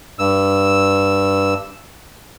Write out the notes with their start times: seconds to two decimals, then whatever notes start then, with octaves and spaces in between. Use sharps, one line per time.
0.19 G2 E6